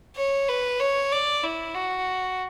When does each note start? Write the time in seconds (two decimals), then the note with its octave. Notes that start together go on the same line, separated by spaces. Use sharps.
0.16 C#5
0.48 B4
0.80 C#5
1.12 D5
1.43 E4
1.74 F#4